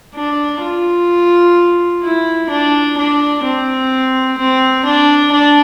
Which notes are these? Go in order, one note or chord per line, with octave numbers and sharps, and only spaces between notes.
D4
F4
E4
D4
D4
C4
C4
D4
D4